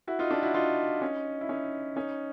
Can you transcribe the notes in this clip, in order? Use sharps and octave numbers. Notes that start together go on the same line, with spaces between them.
E4 F#4
D#4 F4
D4 E4
E4 F#4
D#4 F4
C#4 D#4
E4
C#4 D#4
C#4 D#4